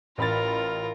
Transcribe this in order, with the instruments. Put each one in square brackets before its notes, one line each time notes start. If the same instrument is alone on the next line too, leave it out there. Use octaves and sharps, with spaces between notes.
[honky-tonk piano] A1 B5 A6 [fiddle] F4 A#4